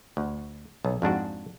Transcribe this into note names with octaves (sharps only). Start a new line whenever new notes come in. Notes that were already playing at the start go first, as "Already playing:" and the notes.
D2
B1
F2 G#2 D4 F#4